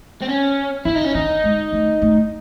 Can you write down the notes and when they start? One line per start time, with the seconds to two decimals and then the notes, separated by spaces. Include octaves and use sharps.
0.22 C4
0.28 C#4
0.85 E3 E4
0.95 D#4
1.05 C#4
1.15 D#3 D#4
1.44 G#3
1.73 A3
2.02 A3